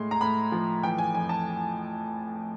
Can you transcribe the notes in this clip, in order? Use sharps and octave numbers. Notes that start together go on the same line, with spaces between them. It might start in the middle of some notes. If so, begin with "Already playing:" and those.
Already playing: A2 G#3 C6
A#5
A2 B5
F3
E3 G5
G#5
F2 G#5
A5